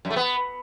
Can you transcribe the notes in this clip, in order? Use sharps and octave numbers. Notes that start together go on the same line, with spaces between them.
F#2
A3
B3